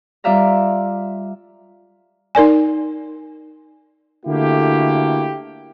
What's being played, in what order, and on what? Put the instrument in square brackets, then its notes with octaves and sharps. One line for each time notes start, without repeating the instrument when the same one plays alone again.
[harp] G3 F4 D5 E5 F5 A#5
[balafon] D#4 A#4 D5 G#5
[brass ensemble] D3 A3 A#3 E4 F#4 G4